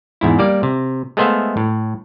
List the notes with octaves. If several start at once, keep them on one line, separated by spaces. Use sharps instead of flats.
E2 G#2 E4
G3 A#3 D5
C3
G#3 A3 B3 C5 E5 F5
A2